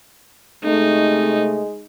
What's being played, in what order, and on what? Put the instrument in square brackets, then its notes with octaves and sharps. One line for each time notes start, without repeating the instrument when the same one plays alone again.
[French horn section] C3 A3 [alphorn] G#3 [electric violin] D#4